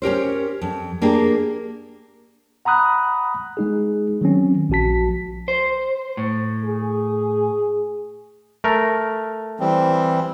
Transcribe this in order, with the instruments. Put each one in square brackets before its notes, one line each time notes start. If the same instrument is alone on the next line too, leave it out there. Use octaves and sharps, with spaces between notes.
[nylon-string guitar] C#4 G4 A#4 C5
F2
A#3 D4 G4 G#4
[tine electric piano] F#5 A#5 B5 D#6 F#6
G#3 D#4 G#4
D#3 F#3 C4 C#4
A#1 F3 F#4 A5 B6
[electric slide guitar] C5
A2
[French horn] G#4
[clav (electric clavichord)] A3 A#4
[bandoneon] E3 G3 C4